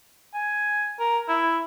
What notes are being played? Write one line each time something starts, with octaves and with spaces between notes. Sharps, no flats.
G#5
A#4
E4